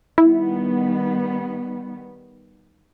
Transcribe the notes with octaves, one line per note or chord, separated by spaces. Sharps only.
D#3 G3 B3 E4